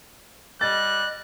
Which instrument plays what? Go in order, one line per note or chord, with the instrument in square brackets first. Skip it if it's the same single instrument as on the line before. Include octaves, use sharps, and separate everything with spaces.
[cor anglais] G3 [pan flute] D#5 [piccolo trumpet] F#6 [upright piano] A6